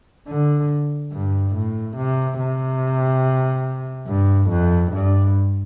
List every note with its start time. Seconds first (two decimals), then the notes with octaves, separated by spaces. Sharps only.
0.28 D3
1.13 G2
1.54 A2
1.97 C3
2.38 C3
4.08 G2
4.50 F2
4.93 G2